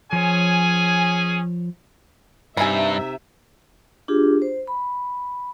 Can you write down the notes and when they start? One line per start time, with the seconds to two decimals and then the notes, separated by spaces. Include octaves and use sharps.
0.13 F3 C#4 G#4 C#5 G#5
2.57 G2 C3 D#4 E5 G#5 A#5 B5
4.08 D4 F4 G4 G#4
4.42 C5
4.67 B5